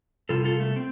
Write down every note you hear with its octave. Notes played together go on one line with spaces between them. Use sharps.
C3 G3 F4 A4
F4 A4
A3
C4